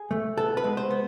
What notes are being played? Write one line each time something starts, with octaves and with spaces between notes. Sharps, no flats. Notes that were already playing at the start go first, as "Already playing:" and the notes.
Already playing: G#4
A3
B3 A4
B4
G#3
C5
B3